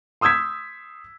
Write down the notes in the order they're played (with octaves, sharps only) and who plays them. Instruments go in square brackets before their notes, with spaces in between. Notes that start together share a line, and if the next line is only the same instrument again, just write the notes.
[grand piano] C6 D#6 E6 G6 G#6 B6